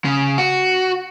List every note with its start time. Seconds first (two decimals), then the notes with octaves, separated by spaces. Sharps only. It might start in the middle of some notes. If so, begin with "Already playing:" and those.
0.05 C#3
0.38 F#4